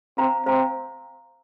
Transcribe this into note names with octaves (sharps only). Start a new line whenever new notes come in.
C4 C5 F5 A#5
C4 C5 F5 A#5